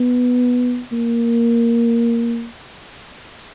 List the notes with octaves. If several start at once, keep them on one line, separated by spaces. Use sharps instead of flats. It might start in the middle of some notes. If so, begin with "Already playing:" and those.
Already playing: B3
A#3